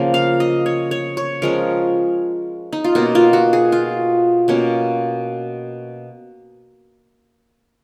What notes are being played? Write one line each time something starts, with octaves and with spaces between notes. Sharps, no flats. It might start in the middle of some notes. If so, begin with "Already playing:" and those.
Already playing: C#3 F3 A#3
F5
D#5
C#5
C#5
C#5
F3 G#3 C#4 A#4
D#4
F4
B2 A#3 C#4 F#4
F4
F#4
G#4
F4
B2 A#3 C#4